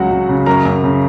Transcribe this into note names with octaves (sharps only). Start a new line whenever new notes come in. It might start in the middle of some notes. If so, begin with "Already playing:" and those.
Already playing: C#2 F#3 F#4 F#5
C#2
C#3
F#2 A#4 A#5
F#2
C#3